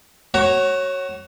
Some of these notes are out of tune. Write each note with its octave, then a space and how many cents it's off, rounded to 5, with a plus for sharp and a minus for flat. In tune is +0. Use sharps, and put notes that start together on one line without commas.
F#4 +20 C#5 -15 A#5 +0